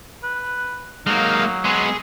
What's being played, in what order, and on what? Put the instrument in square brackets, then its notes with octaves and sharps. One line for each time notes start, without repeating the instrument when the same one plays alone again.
[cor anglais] B4
[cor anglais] F#3 [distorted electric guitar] G#3 A#3 [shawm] D#4 [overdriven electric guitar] F5
[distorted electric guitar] G#3 B3 [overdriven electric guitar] G#4 [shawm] C6